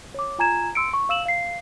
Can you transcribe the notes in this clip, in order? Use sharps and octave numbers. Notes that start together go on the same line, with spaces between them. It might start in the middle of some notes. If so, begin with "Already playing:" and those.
C#5 D6
F4 G#5 A#5 G#6 E7
C6 E6 C#7 D7
C#6
F5 E6 E7 F#7
F5 C7